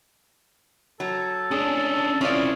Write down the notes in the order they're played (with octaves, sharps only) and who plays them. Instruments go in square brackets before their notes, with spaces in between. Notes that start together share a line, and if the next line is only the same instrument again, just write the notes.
[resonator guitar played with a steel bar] F#3 [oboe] A4
[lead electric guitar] C#4 D4 [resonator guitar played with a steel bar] G#4
[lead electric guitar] C4 E4 [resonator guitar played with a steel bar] C#4 F4 D5 [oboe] G#4